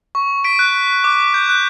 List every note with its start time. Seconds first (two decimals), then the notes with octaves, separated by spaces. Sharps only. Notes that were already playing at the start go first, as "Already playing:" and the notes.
0.15 C#6
0.44 B6 D7
0.59 F#6
1.04 D6
1.34 G6
1.49 F#6